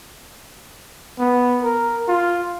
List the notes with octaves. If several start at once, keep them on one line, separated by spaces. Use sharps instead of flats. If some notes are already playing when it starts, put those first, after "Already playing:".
B3
A#4
F4